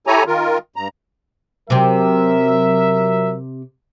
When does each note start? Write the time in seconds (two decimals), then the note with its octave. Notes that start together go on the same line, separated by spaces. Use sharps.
0.07 E4 G4 A4 C#5 G#5 A#5
0.27 D#3 F4 A#4
0.76 G2 A#5
1.70 C3 F#3 C4 A#4 E5